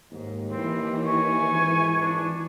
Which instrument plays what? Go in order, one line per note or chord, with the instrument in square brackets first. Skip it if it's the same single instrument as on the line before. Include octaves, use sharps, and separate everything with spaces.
[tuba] D#2 [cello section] G#2
[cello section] E3 [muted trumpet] C4
[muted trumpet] G#5 [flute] C#6
[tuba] G#1
[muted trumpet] D4